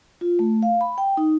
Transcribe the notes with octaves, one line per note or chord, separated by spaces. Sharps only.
F4
A3
F5
B5
G5
D#4